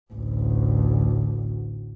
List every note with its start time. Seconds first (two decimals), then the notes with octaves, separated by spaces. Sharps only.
0.13 A1 D2